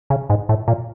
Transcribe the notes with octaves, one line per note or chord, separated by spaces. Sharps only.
C#3
G#2
A2
A#2